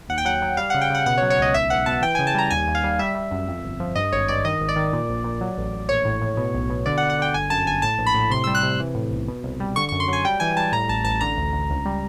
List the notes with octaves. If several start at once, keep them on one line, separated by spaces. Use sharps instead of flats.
D#2 F#5
G5
F#3 F#5
F#3
G3 F5
C#3 F#5
G5
C#3 F#5
B2 F#5
C#5
F#3
C#5
C#2 D#5
B1 E5
B1 F#5
B2 A5
E3 G5
C#3 G#5
A5
G3 A#5
D#2 G#5
D#2
F5
G3
G3 E5
G3
F#2
F2
G1
F3
G2 D#5
G#1 C#5
G2 D5
D#3 D#5
G#1
D5
D#3
A#2
A#1
A#2
F#3
A1
A1
A#1 C#5
A2
A2
B2
B1
B2
D3 D5
F#5
D3
F#5
D3 G5
G1 G#5
F#2 A5
G1 G#5
A2 A5
A#1
B5
A2
C3 C6
G3 E6
F#6
C3
E3
A2
B1
B2
C2
G3
D3 C#6
F#2 C#6
C6
F#3 G#5
G3 G5
E3 G#5
G3 A5
A2 A#5
A1 A5
A1 A5
D3 A#5
D2
D2
C#2
G3